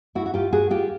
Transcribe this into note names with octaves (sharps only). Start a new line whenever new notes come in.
E4 F#4
F#4
F4 G4
F#4 G#4
F4 G4